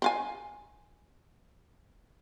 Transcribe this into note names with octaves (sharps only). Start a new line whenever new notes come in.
C4 F5 G#5